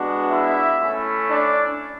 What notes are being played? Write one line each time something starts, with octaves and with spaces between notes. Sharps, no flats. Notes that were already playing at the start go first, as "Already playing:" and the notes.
Already playing: G#3 B3 D4 F#4
E4 E5
A3 C#4 E4
D4 D5